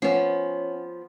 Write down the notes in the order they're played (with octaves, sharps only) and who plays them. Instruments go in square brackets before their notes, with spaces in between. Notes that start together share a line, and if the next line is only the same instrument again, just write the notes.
[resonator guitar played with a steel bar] F3 B3 [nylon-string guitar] C#4